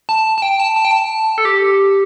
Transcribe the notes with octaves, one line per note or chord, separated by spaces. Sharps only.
A5
A5
G5
A5
A5
G5
A5
A4
G4